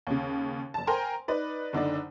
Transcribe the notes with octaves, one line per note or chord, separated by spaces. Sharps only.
D#2 C#3
F#1 A5
A#4 C5 G5 G#5 A#5 C6
D#4 B4 D5
F#1 D3 D#4 D5